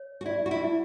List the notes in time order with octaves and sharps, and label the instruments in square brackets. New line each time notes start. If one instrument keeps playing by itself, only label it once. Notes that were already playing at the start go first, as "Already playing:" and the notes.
Already playing: [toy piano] C#5
[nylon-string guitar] F#4
[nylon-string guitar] E4 [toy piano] D5
[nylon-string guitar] F#4
E4
[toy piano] E4